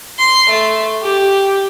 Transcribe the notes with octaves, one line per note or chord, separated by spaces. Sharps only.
C6
A3
G4